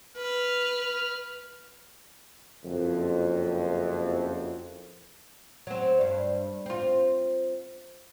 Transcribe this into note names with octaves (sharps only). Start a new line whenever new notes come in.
B4 F6
F#1 F2
F#3 C4
G2
C4 F4